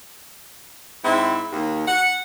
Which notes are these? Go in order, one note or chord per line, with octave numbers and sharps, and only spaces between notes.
G#2 C4 E4
D#2
F#5